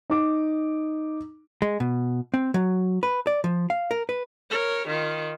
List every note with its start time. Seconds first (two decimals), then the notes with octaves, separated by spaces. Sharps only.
0.10 D#4 D6
1.62 G#3
1.80 B2
2.34 C4
2.54 F#3
3.03 B4
3.27 D5
3.44 F3
3.70 F5
3.91 A#4
4.09 B4
4.51 A#4 C#5
4.88 D#3 F4